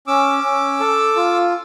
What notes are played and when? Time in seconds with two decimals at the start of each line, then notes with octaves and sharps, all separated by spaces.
0.07 C#4 D6 E6
0.44 C#4
0.80 A4
1.16 F4